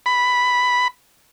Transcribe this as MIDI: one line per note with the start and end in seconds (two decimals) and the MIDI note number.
0.06 0.88 83